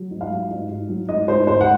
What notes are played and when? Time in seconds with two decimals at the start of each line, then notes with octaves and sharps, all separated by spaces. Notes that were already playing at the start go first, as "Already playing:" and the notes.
Already playing: F#3
0.11 G#2
0.21 F5
0.30 F#3
0.51 G#2
0.69 G#2
0.89 F#3
1.09 G#2 D#5
1.28 G#2 C5
1.47 G#2 C5
1.61 F#5